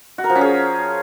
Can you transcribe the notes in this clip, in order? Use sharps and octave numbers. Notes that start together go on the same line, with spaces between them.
F#4
A#4
F3
C#4
G#4